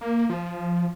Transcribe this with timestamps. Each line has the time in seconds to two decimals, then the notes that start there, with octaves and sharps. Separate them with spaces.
0.01 A#3
0.30 F3